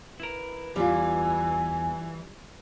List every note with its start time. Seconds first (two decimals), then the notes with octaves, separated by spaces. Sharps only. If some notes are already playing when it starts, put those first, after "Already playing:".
0.20 E4 A#4 B4
0.76 E2 E3 G3 F4 G#5